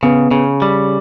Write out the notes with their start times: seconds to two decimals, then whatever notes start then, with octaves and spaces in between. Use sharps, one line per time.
0.03 C#3 B3
0.31 C#3
0.62 G3